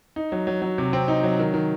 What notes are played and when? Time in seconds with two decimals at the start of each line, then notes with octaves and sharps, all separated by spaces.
0.16 D#4
0.32 F#3
0.47 F#3
0.62 F#3
0.78 C3
0.93 C4
1.08 D#4
1.23 F#3
1.39 D#3
1.54 D#3